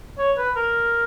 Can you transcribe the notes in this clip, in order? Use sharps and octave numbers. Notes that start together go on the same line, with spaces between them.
C#5
B4
A#4